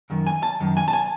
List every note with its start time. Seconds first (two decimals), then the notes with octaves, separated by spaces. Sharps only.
0.10 F#2 D#3
0.27 G#5
0.43 A5
0.60 F#2 D#3
0.77 G#5
0.88 A5
0.93 G#5